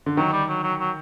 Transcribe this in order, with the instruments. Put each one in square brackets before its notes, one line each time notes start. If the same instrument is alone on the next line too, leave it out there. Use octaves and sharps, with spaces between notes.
[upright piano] D3
[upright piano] D#3 [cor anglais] F#3
[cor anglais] G3
F#3
F#3
F#3